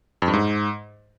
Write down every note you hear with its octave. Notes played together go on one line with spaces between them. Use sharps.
F2
G2
G#2